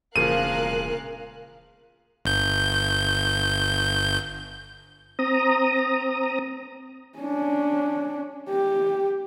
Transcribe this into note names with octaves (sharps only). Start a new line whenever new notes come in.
E1 A#2 C#3 F3 A#4 F5 F#6 D#7
G1 G6
C4 A#5 D#6
C#4 D4
G4